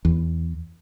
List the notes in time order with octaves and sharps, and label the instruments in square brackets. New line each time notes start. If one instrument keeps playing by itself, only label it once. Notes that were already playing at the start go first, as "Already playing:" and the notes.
[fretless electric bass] E2